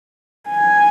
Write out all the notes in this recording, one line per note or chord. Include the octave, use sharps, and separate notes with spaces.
G#5